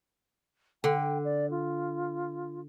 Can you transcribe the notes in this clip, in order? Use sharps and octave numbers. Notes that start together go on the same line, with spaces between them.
D3 G5
D5
F4